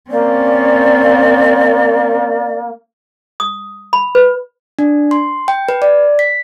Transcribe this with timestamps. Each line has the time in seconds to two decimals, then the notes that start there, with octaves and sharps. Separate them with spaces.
0.11 A#3 C4 C#4 D5
3.40 D#6
3.93 B5
4.15 B4
4.79 D4
5.11 C6
5.48 G5
5.69 B4
5.82 D5
6.19 B6